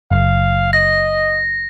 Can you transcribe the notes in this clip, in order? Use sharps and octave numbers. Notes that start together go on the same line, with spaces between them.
F#1 F5
D#5 A#6